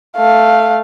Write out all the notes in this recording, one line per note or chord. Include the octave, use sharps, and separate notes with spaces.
A3 F5